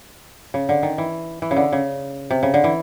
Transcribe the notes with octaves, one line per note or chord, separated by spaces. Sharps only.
C#3
D3
D#3
E3
E3
C#3
D3
C#3
C3
C#3
D3
E3